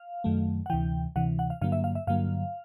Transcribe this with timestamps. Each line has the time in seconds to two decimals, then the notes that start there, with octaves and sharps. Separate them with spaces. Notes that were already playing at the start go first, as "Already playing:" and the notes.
Already playing: F5
0.24 F#2 D#3 F#3 A3
0.66 F#5
0.70 D2 C3 E3 G5
1.16 D2 C3 E3 F#5
1.39 F#5
1.50 F5
1.61 G2 D3 F#3 A#3 F5
1.72 E5
1.84 F5
1.95 E5
2.07 G2 D3 F#3 A#3 F5